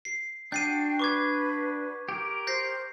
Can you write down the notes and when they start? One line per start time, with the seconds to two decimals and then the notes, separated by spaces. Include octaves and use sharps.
0.05 C7
0.52 D4 F#4 G5 G6 C7 D#7
0.99 B4 C#6 D6 G#6
2.09 G4 A#4
2.47 C5 G6 A#6 C7